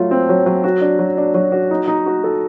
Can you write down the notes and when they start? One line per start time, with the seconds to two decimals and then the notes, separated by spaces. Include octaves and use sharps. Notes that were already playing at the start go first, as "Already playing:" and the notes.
Already playing: F#3 A3 F4
0.11 C4
0.29 F#3
0.46 F#3
0.64 F#4
0.81 D4
0.99 F#3
1.17 D4
1.34 F#3
1.52 F#4
1.71 D#4
1.88 D#4
2.06 F#4
2.24 A4